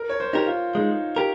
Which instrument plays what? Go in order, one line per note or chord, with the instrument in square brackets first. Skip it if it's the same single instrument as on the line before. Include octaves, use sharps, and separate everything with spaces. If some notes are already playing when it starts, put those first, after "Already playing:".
Already playing: [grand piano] A#4
C#5
C5
[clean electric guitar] D#4 G4 A#4
[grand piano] F4
[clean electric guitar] G#3 [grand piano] D#4
[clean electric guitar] G4 A#4